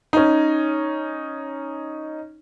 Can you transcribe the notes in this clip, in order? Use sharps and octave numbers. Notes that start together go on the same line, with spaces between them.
C#4 D#4